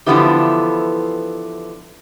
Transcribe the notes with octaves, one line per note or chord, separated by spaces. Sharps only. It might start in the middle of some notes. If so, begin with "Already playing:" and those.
D3 E3 F3 B3 E4 G4